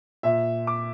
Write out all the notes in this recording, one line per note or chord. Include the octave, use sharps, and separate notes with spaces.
A#2 E5
D6